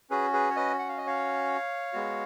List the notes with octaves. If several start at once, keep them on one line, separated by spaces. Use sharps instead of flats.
C#4 F#4 G#4 B4
G#4 B4
C#5
B4 D#5
F#5
F5
D#5
C#5 F5
G#3 B3 F#4